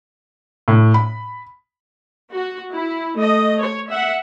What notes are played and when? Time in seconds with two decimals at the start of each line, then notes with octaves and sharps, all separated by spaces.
0.68 A2
0.94 B5
2.34 F#4
2.74 E4
3.16 A3 D#5
3.61 C#5
3.89 E5 F#5